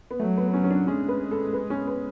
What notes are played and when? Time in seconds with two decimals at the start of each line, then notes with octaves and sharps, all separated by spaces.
0.11 B3
0.20 F#3 A3
0.37 B3
0.48 B3
0.53 C#4
0.64 C#4
0.70 D4
0.87 G#3 C#4
1.09 B4
1.31 A4
1.53 B4
1.70 C#4
1.87 B3